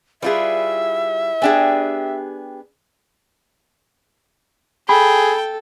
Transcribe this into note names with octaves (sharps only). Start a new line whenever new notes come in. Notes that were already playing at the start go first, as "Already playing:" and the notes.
G3 E4 F4 G#4 B4 E5
B3 D4 G4 G#4 G#5
G#4 A4 G5 B5